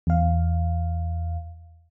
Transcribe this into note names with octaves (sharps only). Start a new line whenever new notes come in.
E2 F5